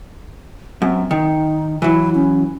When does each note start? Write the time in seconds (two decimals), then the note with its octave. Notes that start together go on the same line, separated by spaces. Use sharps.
0.82 F#2 C4
1.11 D#3 D#4
1.82 E3 F#3 E4
2.15 C#4